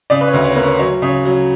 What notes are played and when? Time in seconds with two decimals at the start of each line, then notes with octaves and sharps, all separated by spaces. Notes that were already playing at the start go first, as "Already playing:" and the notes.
0.10 C#3 D5
0.21 B4
0.28 C#5
0.34 D2
0.45 C#5
0.56 A#3 B4
0.62 C#5
0.79 F#3 C#5
1.02 C#3 C#5
1.25 F#3